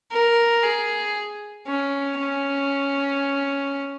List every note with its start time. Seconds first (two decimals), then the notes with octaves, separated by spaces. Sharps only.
0.12 A#4
0.64 G#4
1.67 C#4
2.19 C#4